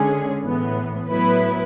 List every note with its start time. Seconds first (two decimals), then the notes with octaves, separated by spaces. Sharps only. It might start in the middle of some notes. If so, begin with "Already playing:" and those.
Already playing: D3 G#3 C#4 G#4
0.44 A2 E3 B3
1.09 A2 F#3 B3 E4 B4